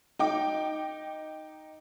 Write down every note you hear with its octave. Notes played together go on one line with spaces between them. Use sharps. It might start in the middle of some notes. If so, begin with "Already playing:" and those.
D#4 G5 D6